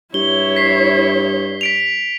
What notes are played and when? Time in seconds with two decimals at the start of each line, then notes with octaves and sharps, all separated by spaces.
0.14 G2 E4 C#5 G7
0.56 B6 C7
1.61 B6 D7 F7